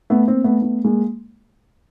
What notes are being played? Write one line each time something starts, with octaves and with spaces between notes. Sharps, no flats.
A3 B3
A#3 C4
A3 B3
A3 B3
G#3 A#3